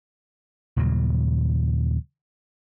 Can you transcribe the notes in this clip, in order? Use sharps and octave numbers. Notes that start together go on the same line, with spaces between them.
D#2 A#2 C#3 F#3